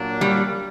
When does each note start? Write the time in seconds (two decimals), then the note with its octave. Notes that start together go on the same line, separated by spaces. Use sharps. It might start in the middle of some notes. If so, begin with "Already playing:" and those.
Already playing: A#2 F#3 A#3 D4
0.21 G3